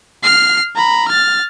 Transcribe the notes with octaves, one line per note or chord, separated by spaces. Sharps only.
F6 C7
A#5 B5
F6 A6